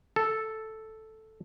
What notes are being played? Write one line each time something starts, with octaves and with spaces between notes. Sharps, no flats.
A4